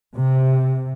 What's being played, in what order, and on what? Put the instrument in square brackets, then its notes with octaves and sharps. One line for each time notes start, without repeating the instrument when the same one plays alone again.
[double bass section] C3